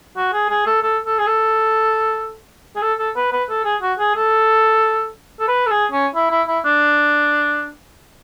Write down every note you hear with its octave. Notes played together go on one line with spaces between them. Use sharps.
F#4
G#4
G#4
A4
A4
A4
G#4
A4
G#4
A4
A4
B4
B4
A4
G#4
F#4
G#4
A4
A4
B4
A4
G#4
C#4
E4
E4
E4
D4